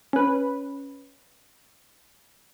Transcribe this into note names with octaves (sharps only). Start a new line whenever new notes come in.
C#4 B4